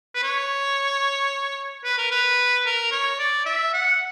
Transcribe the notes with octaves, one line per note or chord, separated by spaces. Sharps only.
B4
C#5
B4
A#4
B4
A#4
C#5
D5
E5
F#5